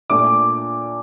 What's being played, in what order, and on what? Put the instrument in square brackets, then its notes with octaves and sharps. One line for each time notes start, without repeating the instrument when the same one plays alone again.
[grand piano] A#2 A3 D4 D6